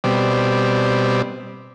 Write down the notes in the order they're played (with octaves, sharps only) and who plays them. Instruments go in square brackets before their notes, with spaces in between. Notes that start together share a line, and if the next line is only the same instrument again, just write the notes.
[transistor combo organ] B2 G3 C4 D5